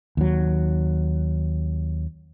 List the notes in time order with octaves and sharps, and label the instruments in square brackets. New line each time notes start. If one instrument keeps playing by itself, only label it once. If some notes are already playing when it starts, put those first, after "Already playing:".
[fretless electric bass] D#2 F#3